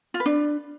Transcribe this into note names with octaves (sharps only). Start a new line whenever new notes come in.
F4
B4
D4